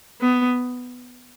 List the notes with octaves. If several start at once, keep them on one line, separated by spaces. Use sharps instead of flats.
B3